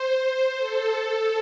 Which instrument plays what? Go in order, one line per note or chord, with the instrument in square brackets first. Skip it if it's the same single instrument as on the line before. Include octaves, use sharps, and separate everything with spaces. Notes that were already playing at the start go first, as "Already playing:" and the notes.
Already playing: [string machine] C5
A4